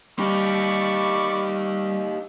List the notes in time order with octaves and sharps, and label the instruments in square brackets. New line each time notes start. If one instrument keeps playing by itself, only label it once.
[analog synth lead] G3 [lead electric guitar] D#4 G4 [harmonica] D5 B5 C#6